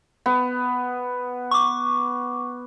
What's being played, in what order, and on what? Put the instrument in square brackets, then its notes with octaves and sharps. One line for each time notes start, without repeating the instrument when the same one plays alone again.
[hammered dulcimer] B3
[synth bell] C#6 D6